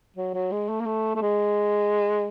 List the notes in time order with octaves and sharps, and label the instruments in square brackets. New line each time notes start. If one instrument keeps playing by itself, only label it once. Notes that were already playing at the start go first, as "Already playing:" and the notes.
[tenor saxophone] F#3
F#3
G#3
A3
A#3
A3
A3
G#3